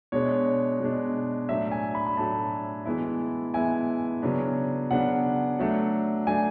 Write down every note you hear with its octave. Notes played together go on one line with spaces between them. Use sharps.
B2 G#3 D4 C#5
B2 G#3 D4
A2 F#3 A3 D4 E5
G#5
B5
B5
A2 F#3 A3 D4 A5
E3 G#3 B3 E4
E3 G#3 B3 E4 G#5
C#3 F#3 B3 D4
C#3 F#3 B3 D4 F#5
F#3 A3 D4
F#3 A3 D4 G#5